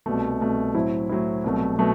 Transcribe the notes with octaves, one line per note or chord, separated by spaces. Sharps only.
C2 B2 A3
C2 B2 A3
A2 F#3 C4 E4
A2 F#3 C4 E4
C2 B2 F#3 A3
B2 F#3 A3